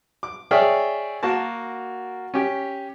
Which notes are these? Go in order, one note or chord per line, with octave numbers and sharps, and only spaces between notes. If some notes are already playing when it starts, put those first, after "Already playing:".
D6
G#4 C#5 D5 E5 G5 F6
A#3 F#4 A#4 A5
C#4 G4